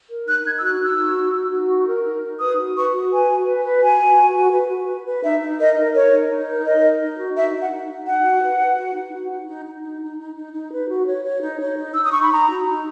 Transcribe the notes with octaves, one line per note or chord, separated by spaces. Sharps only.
A#4
D#4 F#6
D#4 G#6
E6
F#4 F#6
D#4 E6
F#4
D#4
F#4
F#4
D#4
A#4
D#4
D#4
B4 D#6
F#4
B4 C#6
F#4
B4 G#5
F#4
B4
B4
F#4 G#5
F#4
F#4
F#4
B4
F#4
B4
B4
D#4 E5
D#4
A#4 D#5
A#4
A#4 C#5
D#4
D#4
A#4
A#4 D#5
A#4
D#4
F#4
D#4 E5
D#4
F#5
D#4
D#4
D#4 F#5
F#4
B4
B4
F#4
D#4
F#4
D#4
D#4
D#4
D#4
D#4
D#4
D#4
D#4
B4
F#4
C#5
C#5
D#4
C#5
D#4
D#4 E6
D#6
D#4 C#6
B5
D#4 A#5
F#4
D#4